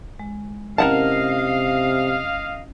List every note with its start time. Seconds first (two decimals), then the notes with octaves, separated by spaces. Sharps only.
0.19 G#3
0.78 C3 C#4 E4 A#4 D#5 F5 F#5 A5